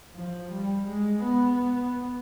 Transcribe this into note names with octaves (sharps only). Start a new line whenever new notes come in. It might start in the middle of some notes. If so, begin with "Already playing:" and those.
F3
G3
G#3
B3